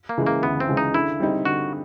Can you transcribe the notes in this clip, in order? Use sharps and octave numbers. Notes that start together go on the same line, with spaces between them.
A#3
C#3 E3 G#3
A#3
D2 B3
C4
C#3 E3 G#3
D#4
D3 E4
G3 C4 D#4
D3 F#4